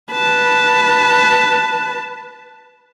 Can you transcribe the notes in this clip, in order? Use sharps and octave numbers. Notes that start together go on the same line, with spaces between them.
B4 A5